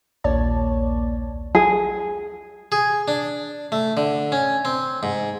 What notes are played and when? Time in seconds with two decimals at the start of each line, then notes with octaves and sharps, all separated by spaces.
0.24 A#1 D#2 A#3 C#5 D5 A5
1.55 G#4
2.72 G#4
3.08 D4
3.72 A3
3.97 D3
4.32 C#4
4.65 C4
5.03 G#2